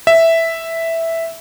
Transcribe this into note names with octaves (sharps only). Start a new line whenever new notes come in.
E5